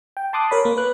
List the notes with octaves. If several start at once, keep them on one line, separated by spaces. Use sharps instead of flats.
G5
A5 C6 D6 D#6 F#6
A#4 C#5 B5
A#3
B4 F#6